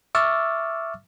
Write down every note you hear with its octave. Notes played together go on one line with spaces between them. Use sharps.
E5 C#6 D6 E6 F6 A6